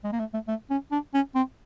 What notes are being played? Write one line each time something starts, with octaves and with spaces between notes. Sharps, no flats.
G#3
A#3
A3
A3
A3
C#4
D4
C#4
C4